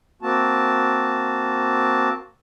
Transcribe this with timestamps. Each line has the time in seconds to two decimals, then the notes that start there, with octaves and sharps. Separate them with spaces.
0.22 A#3 C4 F#4 A5